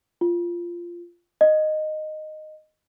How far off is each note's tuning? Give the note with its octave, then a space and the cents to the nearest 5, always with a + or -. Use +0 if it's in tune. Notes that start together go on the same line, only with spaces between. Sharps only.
F4 -10
D#5 -10